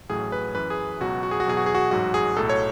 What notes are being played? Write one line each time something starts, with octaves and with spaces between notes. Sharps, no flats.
A1 A2 F#3 G#4
B4
F#2 E3 B4
G#4
C#2 B2 F#3 F#4
F#4
G#4
F#4
E2 B2 F#3 G#4
F#4
G#4
F#4
A1 G#2 F#3 F#4
G#4
B1 A2 F#3 A4
C#5